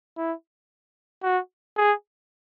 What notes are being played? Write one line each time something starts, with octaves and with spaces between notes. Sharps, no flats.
E4
F#4
G#4